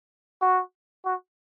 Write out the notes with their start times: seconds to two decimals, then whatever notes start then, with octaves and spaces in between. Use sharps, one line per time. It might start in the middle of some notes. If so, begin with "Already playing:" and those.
0.42 F#4
1.05 F#4